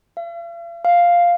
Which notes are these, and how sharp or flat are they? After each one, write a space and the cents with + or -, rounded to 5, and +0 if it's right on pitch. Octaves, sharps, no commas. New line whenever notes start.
F5 -45
F5 +0